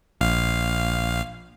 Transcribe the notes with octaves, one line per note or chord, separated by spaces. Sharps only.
A#1 F5